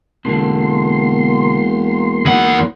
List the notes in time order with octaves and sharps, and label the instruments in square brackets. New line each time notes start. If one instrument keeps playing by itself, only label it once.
[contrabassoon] E1 [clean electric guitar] B2 D3 [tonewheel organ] A#3 C6
[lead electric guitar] E2 F#5 [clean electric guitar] D#4 F#4 B4